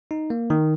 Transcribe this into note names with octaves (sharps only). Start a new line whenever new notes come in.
D#4
A#3
D#3